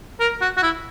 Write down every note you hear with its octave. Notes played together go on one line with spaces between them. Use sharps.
A#4
F#4
F#4
E4